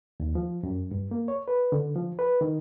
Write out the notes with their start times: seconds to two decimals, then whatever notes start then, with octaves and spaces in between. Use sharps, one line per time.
0.20 D#2
0.35 F3
0.63 F#2
0.91 G2
1.11 A#3
1.28 C#5
1.48 B4
1.72 D3
1.96 F3
2.19 B4
2.41 D#3